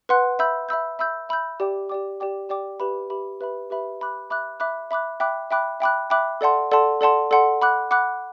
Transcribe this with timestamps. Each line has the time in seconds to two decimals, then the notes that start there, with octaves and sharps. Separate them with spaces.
0.09 B4 F#5 C6 F#6
0.39 E5 B5 E6 G6
0.69 E5 B5 E6 G6
0.99 E5 B5 E6 G6
1.29 E5 B5 E6 G6
1.60 G4 D5 G5 D6
1.89 G4 D5 G5 D6
2.20 G4 D5 G5 D6
2.49 G4 D5 G5 D6
2.80 G4 B4 E5 B5
3.10 G4 B4 E5 B5
3.40 G4 B4 E5 B5
3.70 G4 B4 E5 B5
4.01 E5 B5 D6 F#6
4.30 E5 B5 D6 F#6
4.60 E5 B5 D6 F#6
4.91 E5 B5 D6 F#6
5.20 E5 G5 B5 D6 F#6
5.51 E5 G5 B5 D6 F#6
5.80 E5 G5 B5 D6 F#6
6.10 E5 G5 B5 D6 F#6
6.41 A4 D5 F#5 A5 C6
6.71 A4 D5 F#5 A5 C6
7.01 A4 D5 F#5 A5 C6
7.31 A4 D5 F#5 A5 C6
7.62 F#5 B5 D6 F#6
7.91 F#5 B5 D6 F#6